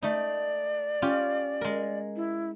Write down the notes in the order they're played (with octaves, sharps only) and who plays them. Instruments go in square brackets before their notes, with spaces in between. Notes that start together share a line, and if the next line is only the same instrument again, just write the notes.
[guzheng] A3 D#4 [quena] D5
[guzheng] C#4 F4 G4
G#3 A#4
[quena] E4